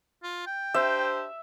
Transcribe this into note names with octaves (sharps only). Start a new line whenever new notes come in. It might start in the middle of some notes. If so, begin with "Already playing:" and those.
F4
G5
D4 G4 C5 E5